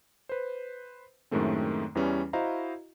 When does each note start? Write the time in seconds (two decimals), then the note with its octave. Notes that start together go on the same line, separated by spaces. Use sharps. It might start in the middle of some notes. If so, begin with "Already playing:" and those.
0.29 B4 C5
1.31 F#2 A2 D#3 G#3 A3 C4
1.95 E2 E3 G3 C#4
2.33 E4 F#4 C5 D#5 F5 A#5